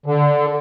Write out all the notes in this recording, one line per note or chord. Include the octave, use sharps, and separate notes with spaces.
D3